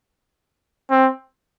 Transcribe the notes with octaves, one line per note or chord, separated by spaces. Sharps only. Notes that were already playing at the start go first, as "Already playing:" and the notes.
C4